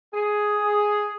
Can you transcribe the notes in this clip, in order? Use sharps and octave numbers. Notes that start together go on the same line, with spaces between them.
G#4